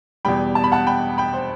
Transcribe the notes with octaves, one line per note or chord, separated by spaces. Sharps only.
E2 B2 G3 G5 B5
A5
B5
F#5 A5
G5 B5
G5 B5
C5